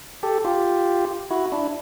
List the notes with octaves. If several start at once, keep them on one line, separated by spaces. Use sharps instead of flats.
G4 A4
F4 G4
E4 F#4
D4 E4